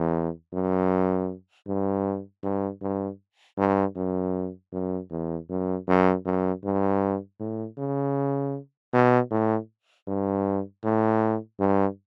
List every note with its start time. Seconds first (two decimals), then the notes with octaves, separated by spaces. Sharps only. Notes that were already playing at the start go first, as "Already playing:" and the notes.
Already playing: E2
0.53 F#2
1.67 G2
2.43 G2
2.82 G2
3.58 G2
3.96 F#2
4.72 F#2
5.11 E2
5.50 F#2
5.88 F#2
6.26 F#2
6.64 G2
7.40 A2
7.78 C#3
8.93 B2
9.31 A2
10.07 G2
10.84 A2
11.60 G2